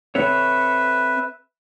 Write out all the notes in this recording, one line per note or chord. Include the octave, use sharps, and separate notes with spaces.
C4 A4 B4 C#5 E5